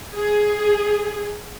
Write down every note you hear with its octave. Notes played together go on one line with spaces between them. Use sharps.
G#4